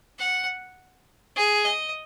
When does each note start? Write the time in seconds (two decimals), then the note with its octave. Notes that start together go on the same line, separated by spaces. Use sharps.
0.19 F#5
1.36 G#4
1.65 D#5